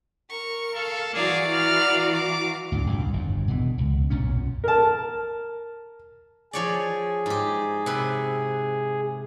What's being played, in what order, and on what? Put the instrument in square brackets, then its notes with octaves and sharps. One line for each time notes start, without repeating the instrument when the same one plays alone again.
[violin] A#4 C#6
[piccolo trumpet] A4 [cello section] F5
[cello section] E3 F#4 [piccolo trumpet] G#4 [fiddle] D5 [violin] F5 A#5
[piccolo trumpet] F6
D6
[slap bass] D2 G#2
C2 G2 A#2
G1 F2
B2 D3 E3
C#2
B1 F#2 A#2 C#4
[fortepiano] A#4 A5
[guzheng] F3 C#5 D5 [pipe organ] G#4
[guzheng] G#2 G4
C3 B4